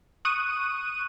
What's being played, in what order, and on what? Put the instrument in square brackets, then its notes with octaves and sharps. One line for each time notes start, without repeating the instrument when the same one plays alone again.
[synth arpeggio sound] C#6 D#6 F#6 D#7